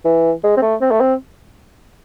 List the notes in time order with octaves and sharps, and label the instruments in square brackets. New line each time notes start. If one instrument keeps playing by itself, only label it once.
[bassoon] E3
G#3
C4
A3
C4
A3
C4